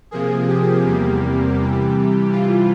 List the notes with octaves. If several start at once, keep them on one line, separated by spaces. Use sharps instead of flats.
C3 F3 A#3 G#4
G4
E2 C3 G3 A#3
C3 E3 G3
C3 E3 G3 F4